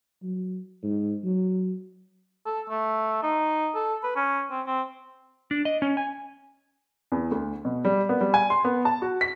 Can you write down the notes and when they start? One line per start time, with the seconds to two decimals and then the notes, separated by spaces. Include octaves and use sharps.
0.22 F#3
0.83 G#2
1.24 F#3
2.46 A4
2.70 A3
3.23 D#4
3.75 A4
4.04 B4
4.16 C#4
4.50 C4
4.67 C4
5.51 D4
5.65 D#5
5.82 C#4
5.97 G#5
7.12 E2
7.31 D2
7.65 B2
7.85 G3
8.09 B3
8.21 G3
8.34 G#5
8.50 C6
8.65 B3
8.85 A5
9.02 F#4
9.21 B6